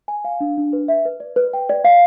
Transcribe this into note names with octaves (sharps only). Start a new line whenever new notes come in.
G#5
F5
D4
D4
B4
E5
B4
D5
B4
G5
D5
F5